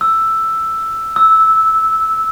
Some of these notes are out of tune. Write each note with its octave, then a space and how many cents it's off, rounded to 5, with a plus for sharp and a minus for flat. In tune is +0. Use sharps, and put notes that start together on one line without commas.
E6 +5
E6 -10